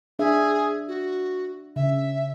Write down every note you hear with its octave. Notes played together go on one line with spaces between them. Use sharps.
D4 G#4 E5
F#4
C#3 E5